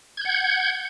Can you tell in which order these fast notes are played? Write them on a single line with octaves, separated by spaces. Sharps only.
G#6 G6 F#5